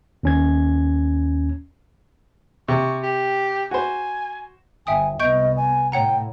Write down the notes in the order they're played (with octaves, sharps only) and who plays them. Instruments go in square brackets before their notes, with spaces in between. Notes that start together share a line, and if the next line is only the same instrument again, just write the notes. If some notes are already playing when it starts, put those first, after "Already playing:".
[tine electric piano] D#2 C#4 G#6
[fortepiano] C3 [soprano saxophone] C#6
[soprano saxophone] G4
[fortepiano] F#4 C5 [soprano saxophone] G#5
[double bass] G1 [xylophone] E5 G5 D#6 [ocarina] G#5
[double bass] C2 B3 [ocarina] D#5 [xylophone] C#6 G6 D7
[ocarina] G#5
[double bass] A2 [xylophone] C#5 F#5 A#5 [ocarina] G5